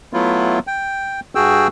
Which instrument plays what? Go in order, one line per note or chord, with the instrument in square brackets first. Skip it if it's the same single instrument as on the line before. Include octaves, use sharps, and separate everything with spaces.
[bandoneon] F#3 A3 B3 E4 F4
G5
G2 F#4 G#4 G5 E6